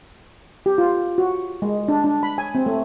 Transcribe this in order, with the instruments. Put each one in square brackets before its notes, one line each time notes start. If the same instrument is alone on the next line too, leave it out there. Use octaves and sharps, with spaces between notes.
[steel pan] G4
F4
F#4
G#3
D4
D4
B5
G#5
C4
A3